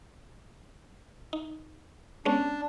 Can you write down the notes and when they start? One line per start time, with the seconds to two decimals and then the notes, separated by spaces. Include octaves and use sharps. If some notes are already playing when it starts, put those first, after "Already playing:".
1.33 D#4
2.25 G#3 B3 C#4 D4